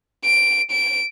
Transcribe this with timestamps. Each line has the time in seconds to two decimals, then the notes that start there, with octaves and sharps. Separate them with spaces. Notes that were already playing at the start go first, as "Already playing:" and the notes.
0.25 D7
0.72 D7